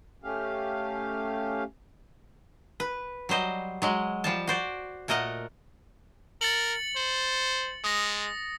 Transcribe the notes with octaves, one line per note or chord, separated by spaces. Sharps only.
A3 C#4 G4 F5
B4
F#3 G3 C5 D#5
F#3 G#3 D#5
F3 G3 A5
F#4 C5 D5
A#2 A3 A#4 D#5 F#5
A#4 A6 C#7 F#7
C5
G#3 D#6 A#6